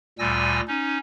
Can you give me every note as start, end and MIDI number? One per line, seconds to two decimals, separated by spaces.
0.19 0.61 38
0.19 0.61 46
0.19 0.61 55
0.19 0.61 80
0.19 0.61 88
0.19 0.61 94
0.67 0.98 61
0.67 0.98 63